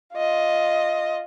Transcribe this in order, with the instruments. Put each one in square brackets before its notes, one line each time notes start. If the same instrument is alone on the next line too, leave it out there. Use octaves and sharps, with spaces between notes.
[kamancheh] F4 D#5